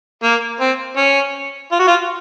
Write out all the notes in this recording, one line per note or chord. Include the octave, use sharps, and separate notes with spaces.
A#3
C4
C#4
F4
F#4
F4